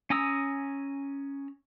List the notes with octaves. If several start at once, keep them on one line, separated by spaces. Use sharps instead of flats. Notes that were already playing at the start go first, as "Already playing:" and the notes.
C#4 G#5 A#5 D#6 E6